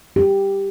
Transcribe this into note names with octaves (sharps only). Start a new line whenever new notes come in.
G4